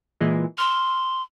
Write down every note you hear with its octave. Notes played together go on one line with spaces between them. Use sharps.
A#2 E3 G#3
C6 E6 F6